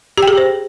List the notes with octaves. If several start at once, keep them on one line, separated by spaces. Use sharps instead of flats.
G4
G5
G#4
G4
C5